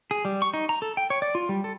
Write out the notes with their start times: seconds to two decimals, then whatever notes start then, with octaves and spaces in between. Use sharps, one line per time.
0.11 G#4
0.25 G3
0.42 C#6
0.54 D#4
0.69 A#5
0.82 A4
0.97 G5
1.10 C#5
1.22 D5
1.35 F4
1.49 G3
1.64 A4